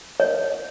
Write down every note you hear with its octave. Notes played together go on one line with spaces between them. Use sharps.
C#5